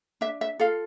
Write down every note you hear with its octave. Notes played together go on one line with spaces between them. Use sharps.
D4 E5
E5
F4 A4 F5